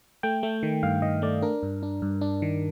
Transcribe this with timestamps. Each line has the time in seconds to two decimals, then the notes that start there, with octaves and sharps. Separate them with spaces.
0.23 A3 G5
0.43 A3
0.63 D#3
0.83 G2 F5
1.02 D#3 D#5
1.22 A3 D5
1.42 D4 A#4
1.63 G2
1.83 D4
2.02 G2
2.21 D4
2.42 D#3